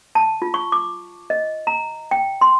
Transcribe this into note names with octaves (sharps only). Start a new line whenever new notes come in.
A5
F4
C#6
D6
D#5
A#5
G5
C6